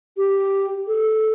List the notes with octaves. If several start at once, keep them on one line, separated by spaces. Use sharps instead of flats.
G4
A4